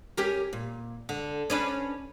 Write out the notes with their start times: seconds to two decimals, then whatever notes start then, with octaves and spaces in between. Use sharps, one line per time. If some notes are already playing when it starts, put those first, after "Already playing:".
0.17 C#4 G4 A#4
0.53 A#2
1.09 D3
1.50 C#4 D4 B4